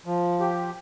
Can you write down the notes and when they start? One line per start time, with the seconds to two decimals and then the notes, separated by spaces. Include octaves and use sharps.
0.06 F3
0.40 G4